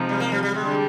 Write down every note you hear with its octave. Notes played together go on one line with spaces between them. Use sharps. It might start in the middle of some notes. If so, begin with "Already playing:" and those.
Already playing: C3 F3 G#3 D#4
G3
A#3
G3
G3
D3 G3 G#3 D4